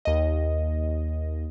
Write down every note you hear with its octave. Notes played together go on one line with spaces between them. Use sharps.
D#2 D#5